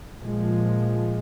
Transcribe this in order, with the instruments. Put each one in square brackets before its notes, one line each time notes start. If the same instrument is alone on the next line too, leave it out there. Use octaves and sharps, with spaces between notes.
[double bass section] A#2 F3 G#3